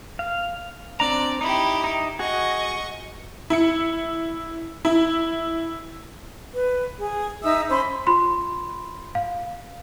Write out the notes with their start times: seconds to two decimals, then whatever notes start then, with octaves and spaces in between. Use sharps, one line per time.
0.19 F5
1.00 C4 D4 D5 A#5
1.41 D#4 E4 G4 B5
1.84 D#4 E5
2.19 F#4 G#4 D#5 C#6
3.50 E4 C#7
4.85 E4
6.55 B4
6.98 G#4
7.43 D#4 E5 D#6 E6
7.70 C#4 C5 B5 C6
8.07 F4 B5 C6
9.15 F5